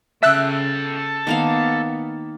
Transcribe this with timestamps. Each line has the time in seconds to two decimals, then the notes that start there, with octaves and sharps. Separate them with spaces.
0.23 C#3 A4 E5 G5 E6 F#6
1.27 D#3 A#3 B3 F5